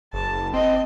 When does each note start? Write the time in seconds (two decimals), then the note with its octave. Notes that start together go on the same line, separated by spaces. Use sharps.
0.13 F#1 A5
0.54 C4 D#5